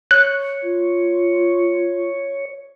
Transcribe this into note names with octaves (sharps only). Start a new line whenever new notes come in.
C#5 F#6
F4